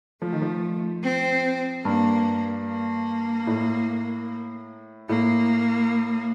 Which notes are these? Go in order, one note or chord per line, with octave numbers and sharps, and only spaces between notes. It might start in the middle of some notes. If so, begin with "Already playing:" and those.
F3 A3
D#3
F3
C4
G2 A#3
A#3
A2
A2 A#3